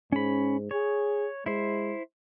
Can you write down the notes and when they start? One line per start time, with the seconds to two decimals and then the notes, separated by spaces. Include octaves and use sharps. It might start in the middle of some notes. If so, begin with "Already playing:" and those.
0.12 G#2 C#4 B5
0.71 G#4 C#5
1.46 G#3 E4 C5